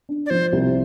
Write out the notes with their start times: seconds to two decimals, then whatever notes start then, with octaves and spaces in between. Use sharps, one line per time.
0.09 D4
0.26 D5
0.30 F3 C5
0.53 C2